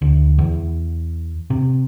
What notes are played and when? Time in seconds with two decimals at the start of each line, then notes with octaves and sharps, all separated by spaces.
0.02 D2
0.38 E2
1.50 C3